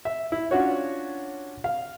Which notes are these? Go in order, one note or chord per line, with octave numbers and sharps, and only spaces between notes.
E5
E4
C#4 D4 F4 F#4 C#5
F5